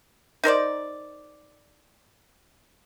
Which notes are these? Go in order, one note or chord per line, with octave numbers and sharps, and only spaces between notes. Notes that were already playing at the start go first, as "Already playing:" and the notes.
D#4 A#4 C5 D5